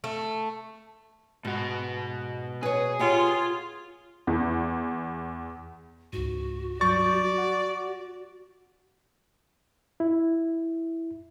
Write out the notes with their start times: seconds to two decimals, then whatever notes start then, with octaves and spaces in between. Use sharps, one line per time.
0.04 A3
1.45 G#2 B2 F#4
2.63 G#4 B4 C#5
2.99 F4 G4 C#5 F#5
4.27 E2
6.13 C#2 G#2 F#4
6.81 G2 F#3 D5 C#6 G6 A6
7.38 F#5
10.00 E4